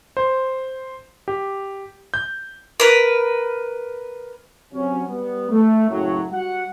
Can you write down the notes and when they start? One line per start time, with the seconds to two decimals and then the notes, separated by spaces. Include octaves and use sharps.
0.17 C5
1.28 G4
2.14 G6
2.80 A#4 B4
4.73 C3 F#3 C#4
5.07 G3 B3
5.50 A3
5.89 F#1 A2 F#3
6.32 G3 F#4 F#5